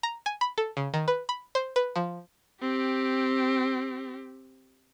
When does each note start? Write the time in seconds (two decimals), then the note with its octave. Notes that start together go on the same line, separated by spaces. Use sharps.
0.03 A#5
0.26 G#5
0.41 B5
0.58 A4
0.77 C#3
0.94 D#3
1.08 B4
1.29 B5
1.55 C5
1.76 B4
1.96 F3
2.62 C4 G4